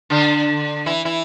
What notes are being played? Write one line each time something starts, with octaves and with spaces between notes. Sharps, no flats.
D3 D4
E3 E4
E3 E4